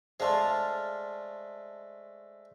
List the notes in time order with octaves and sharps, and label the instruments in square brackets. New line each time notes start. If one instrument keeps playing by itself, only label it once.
[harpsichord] G#3 A3 [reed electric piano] C5 D5 C6 [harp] F5 A5 F6